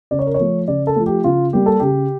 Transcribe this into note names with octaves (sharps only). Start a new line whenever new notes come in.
C#3 D5
C#5
A#4
C#5
F3 A3
C#3 D5
A4
F3 A3
G4
C#3 F4
G3 A#3 G4
A4
C#3 G4